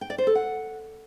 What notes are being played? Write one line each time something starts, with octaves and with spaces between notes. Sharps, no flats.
G5
D5
C5
A4
F#5